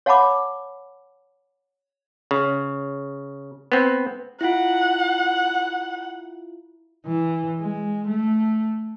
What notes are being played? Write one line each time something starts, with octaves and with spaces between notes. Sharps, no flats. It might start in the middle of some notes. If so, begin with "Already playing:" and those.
C#5 F5 F#5 A5 B5 D6
C#3
B3 C4
E4 F4 F#5
E3
G#3
A3